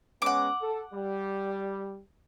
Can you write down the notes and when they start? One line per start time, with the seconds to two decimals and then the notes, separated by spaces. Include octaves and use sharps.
0.22 G#3 B3 C#4 F#5 D6
0.62 A4
0.93 G3